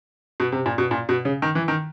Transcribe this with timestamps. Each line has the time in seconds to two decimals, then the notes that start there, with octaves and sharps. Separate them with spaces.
0.40 B2
0.52 C3
0.66 A#2
0.78 B2
0.91 A#2
1.09 B2
1.25 C#3
1.42 D#3
1.55 E3
1.68 D#3